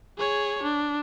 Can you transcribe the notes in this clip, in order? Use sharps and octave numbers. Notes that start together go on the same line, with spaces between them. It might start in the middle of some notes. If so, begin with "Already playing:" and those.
G#4 C#5
D4